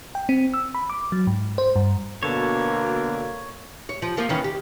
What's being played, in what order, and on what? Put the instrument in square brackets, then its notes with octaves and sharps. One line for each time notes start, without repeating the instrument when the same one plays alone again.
[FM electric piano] G5
C4
E6
B5
D6
F#3
G#2
C5
G2
[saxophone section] B2 D3 [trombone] A#3 [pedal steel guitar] C#5 A5
[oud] C#5
F3
F3 A#3 F4
D#3 E3 C#4
G4